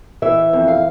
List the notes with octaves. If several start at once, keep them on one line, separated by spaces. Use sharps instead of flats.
E3 E5
F2
F5